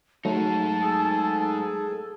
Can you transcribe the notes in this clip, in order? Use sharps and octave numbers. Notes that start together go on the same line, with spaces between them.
F#3 G#3 A3 D#4 A5
G#4 A4